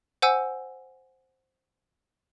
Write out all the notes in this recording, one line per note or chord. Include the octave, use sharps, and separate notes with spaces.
C5 F#5 G#5 E6